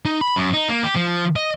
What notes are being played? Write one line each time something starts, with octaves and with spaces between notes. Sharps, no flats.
D#4
B5
F#2
D#4
A#3
G4
F3
D#5